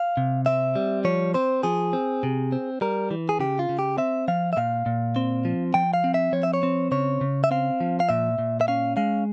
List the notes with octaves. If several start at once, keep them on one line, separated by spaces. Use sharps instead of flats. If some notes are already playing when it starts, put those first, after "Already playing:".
Already playing: F5
C3
C4 E5
G3
F3 C#5
C4 C5
F3 G#4
C4
C3
C4
G3 A#4
E3
G#4
C#3 G4
F4
C#3
G4
C4 E5
F3 F5
E5
A#2 F5
A#2
C4
F3
F3 G5
F5
C4
E5
F3 C#5
E5
C#5
C4
C#3 C#5
C#3
E5
C4 F5
F3
F5
A#2 E5
A#2
E5
C#4 F5
G#3 F5